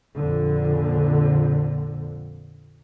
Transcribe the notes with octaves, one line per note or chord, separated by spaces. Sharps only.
A#1 F2 D3